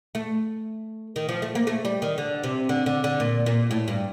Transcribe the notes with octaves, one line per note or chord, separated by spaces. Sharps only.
A3
D#3
F3
A3
A#3
A3
G3
D#3
D3
C3
D3
D3
D3
A#2
A#2
A2
G2